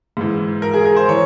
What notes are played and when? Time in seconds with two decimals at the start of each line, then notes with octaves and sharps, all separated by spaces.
0.17 G#2 E3
0.62 A#4
0.74 G#4
0.85 A#4
0.96 C5
1.08 E3 C#5